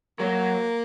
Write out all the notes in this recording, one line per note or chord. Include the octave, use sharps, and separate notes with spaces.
F#3 A#3